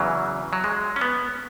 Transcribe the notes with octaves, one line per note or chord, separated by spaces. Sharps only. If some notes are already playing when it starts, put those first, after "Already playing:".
Already playing: E2 C#3 E3 F#3
F#3
G#3
C#4
B3